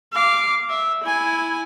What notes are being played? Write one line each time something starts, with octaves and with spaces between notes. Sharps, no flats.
F5 D6
E5
E4 G#5